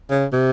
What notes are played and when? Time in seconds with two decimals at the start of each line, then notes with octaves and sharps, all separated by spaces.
0.10 C#3
0.33 C3